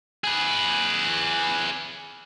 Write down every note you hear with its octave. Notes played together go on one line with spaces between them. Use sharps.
G#4 B4